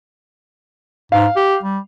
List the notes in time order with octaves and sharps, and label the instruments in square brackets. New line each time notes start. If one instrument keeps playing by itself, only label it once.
[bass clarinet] G#2 [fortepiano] F5
[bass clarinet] G4
G3